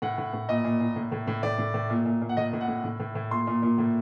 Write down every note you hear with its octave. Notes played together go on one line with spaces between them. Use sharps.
A2 F#5
A2
A2
A#2 D#5
A#2
A#2
A2
A2
A2
A2 D5
A2
A2
A#2
A#2
A#2
F#5
A2 D#5
A2
F#5
A2
A2
A2
A2
A#2 C6
A#2
A#2
A2